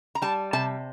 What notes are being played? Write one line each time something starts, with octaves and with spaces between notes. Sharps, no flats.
A#5
G3 A5
C3 A5